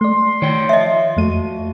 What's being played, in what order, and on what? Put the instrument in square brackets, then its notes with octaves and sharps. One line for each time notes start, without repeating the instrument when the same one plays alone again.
[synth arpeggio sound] A3 D5 [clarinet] C6
[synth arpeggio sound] D#3 [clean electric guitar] C#5 D5 G5
[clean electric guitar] F3 [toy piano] D#5 E5
[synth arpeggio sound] F2 A3 D#7 [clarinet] F#4